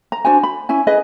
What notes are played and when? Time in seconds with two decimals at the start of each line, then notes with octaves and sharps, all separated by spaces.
0.12 A#5
0.25 D4 F#4 C5 G#5
0.43 B5
0.69 C#4 E4 G#5
0.87 G#4 B4 D#5